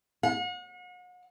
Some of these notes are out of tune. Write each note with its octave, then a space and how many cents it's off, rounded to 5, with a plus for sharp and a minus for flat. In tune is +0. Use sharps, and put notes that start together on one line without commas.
F#5 -40